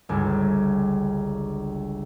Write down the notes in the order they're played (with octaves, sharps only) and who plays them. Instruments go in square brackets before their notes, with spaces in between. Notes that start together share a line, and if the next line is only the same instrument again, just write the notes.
[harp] G1 C#2